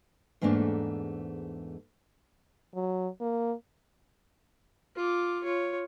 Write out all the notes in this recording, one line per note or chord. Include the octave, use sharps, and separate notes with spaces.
E2 G#2 A3 A#3 D4
F#3
A#3
F4 D6
F4 C#5